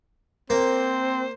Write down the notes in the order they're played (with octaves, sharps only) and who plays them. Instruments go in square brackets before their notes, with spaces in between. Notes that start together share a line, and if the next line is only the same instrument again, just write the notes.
[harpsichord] A#3 [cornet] C4 [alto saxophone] C5